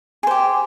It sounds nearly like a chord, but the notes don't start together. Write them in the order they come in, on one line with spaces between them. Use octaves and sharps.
G#4 C5 G4